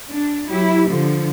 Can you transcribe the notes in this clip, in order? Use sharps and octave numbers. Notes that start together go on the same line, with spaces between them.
D4
F#3 E4 G4
D3 F3